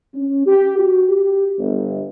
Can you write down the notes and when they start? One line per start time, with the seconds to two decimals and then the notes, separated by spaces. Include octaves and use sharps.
0.15 C#4
0.47 G4
0.79 F#4
1.09 G4
1.59 G1